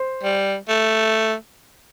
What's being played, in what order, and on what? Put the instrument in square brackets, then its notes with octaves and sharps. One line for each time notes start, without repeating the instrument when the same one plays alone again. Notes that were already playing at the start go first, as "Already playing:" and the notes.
Already playing: [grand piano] C5
[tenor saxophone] G3
A3